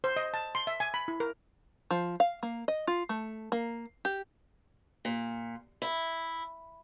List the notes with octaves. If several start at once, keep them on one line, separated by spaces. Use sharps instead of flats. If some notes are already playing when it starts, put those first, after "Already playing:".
C5
D#5
A5
C6
E5
G#5
B5
E4
A#4
F3
F5
A#3
D#5
F4
A3
A#3
G4
A#2
E4